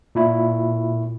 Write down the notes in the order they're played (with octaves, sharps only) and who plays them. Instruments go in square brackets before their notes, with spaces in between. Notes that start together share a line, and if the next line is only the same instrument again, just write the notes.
[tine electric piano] A#2 E4